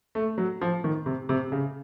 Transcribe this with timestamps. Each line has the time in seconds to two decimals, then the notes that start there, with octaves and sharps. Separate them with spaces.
0.15 A3
0.38 F#3
0.61 F3
0.84 D#3
1.06 C3
1.29 C3
1.52 C#3